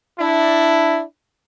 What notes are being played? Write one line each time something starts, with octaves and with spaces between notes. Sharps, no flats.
D4 E4